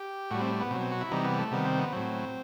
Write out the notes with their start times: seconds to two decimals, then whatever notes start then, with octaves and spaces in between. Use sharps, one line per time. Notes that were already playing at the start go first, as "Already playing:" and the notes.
Already playing: G4
0.31 A2 G3 F#4
0.40 C4
0.60 B3
0.71 B2 C4
0.75 F#3
0.81 C4
0.92 F#4
1.01 E4
1.11 C3 E3 G3 D#4
1.25 B3
1.39 A3
1.51 C3 D#3 G3 B3
1.65 C4
1.78 B3
1.92 A2 F#3 C4